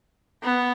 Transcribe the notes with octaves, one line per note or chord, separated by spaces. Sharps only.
B3